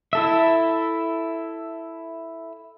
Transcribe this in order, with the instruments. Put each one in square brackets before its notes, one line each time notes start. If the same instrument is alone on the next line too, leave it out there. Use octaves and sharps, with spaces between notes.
[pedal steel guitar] E4 A4 E5